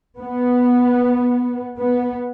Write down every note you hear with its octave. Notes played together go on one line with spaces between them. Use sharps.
B3
B3